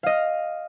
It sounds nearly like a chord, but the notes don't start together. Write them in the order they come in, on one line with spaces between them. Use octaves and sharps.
F5 D#5 F6